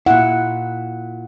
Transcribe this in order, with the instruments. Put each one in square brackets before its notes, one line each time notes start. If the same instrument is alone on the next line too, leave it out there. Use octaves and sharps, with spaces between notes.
[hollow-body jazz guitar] A#2 E4 [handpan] F#5